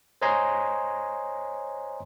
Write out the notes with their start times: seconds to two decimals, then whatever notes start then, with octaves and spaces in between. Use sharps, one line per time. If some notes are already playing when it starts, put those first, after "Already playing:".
0.22 C5 C#5 D#5 G#5 A#5 C6